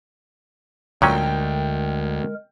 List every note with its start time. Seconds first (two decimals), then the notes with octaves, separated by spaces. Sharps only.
1.02 D2 A#2 F#3 G#3 C#4 A#4 G5